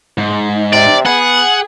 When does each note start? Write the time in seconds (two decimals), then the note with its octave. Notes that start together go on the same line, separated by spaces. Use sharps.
0.18 G#2
0.73 C3 D5
1.06 B3 G#4 F#5